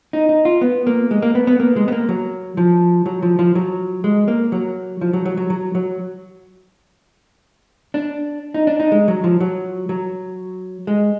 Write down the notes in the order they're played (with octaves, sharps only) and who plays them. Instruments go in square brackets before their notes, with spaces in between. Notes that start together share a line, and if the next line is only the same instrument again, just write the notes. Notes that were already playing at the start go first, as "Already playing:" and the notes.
[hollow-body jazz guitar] D#4
D#4
F4
B3
A#3
G#3
A#3
B3
B3
A#3
G#3
B3
A#3
F#3
F3
F#3
F3
F3
F#3
G#3
A#3
F#3
F3
F#3
F#3
F#3
F#3
F#3
D4
D#4
D4
D#4
G#3
F#3
F3
F#3
F#3
G#3